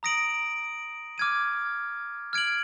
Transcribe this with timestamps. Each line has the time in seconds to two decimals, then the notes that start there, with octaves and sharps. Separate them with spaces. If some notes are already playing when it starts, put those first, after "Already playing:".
0.03 A#5 D#6 A#6 D7 F#7
1.18 D6 F6 G#6 D#7
2.33 F6 G#6 D7 F#7